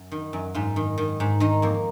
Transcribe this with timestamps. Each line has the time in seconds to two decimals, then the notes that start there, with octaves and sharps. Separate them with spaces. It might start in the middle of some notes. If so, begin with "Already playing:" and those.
Already playing: F#2
0.12 D#3
0.33 F#2
0.55 G#2 F4
0.76 D#3
0.98 D#3
1.20 G#2
1.40 D#3 D#4
1.62 F2 A#3